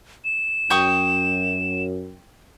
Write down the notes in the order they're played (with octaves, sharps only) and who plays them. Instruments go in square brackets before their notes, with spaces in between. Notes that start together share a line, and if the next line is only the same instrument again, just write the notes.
[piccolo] E7
[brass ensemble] F#2 [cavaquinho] G5 C#6 D#6